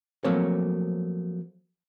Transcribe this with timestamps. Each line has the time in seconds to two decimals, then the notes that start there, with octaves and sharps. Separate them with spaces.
0.24 F3 F#3 A3 A#3 C4 C#5